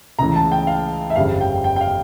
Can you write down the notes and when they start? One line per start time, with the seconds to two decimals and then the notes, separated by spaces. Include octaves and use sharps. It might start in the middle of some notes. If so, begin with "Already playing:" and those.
0.19 C#2 C#3 E3 A3 A#5
0.36 A5
0.52 G5
0.67 F5
1.10 E5
1.16 G1 F2 C#3 G3 F5
1.41 G5
1.64 G5
1.76 G5
1.81 F5